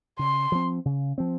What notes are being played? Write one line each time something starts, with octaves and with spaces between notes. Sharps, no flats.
C#3 C6
F3 C4
C#3
F3 C4